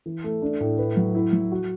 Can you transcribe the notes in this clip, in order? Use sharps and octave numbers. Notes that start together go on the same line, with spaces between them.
E3
A3
D4
A2
B4
F#3
E4
F#3
F#4